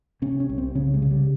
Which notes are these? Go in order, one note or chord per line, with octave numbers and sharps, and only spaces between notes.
C3 C#4
C#4
C2
C4
C#3 C#4
G#3
C#3
G3